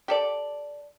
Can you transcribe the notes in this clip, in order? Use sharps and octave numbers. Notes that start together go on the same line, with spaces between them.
G4 A4 D5